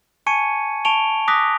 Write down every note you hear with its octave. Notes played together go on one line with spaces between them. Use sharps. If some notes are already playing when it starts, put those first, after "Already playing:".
G#5 A5 C#6 G#6 C#7 D#7
A5 C#6 D7 F7 G7
D6 D#6 F#6 A#6 B6